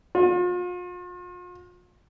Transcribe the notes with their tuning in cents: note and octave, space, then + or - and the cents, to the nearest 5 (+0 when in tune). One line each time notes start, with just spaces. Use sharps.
F4 +40